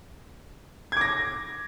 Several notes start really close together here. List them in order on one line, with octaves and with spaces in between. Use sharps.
G#6 D6 A#6